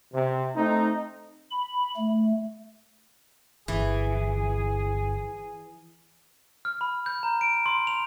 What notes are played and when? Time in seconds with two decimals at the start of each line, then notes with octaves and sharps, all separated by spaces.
0.13 C3
0.55 A3 C4 D#4
1.51 B5
1.97 A3
3.68 G1 E3 G#4
6.65 F6
6.81 B5
7.06 G6
7.23 A#5
7.41 D7
7.66 C6
7.87 F7